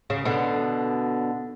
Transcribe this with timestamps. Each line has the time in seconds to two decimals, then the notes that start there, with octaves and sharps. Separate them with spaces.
0.10 C#3
0.25 B2 D3